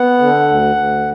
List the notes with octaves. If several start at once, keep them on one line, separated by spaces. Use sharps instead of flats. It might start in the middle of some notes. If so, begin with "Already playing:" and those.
Already playing: B3 F#5
D3
D2
D2